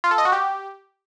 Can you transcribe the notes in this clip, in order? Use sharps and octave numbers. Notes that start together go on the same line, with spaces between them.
F4
A4
D#5
F#4
G4